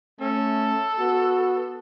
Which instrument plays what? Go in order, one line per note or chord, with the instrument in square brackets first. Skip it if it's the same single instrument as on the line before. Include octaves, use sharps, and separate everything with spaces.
[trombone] A3 [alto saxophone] C#4 [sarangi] A4
[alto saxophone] B3 [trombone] F#4